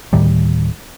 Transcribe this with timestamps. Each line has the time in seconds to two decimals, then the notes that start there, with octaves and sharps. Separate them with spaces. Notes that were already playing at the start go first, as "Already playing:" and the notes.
0.13 D1 A2 D#3 G3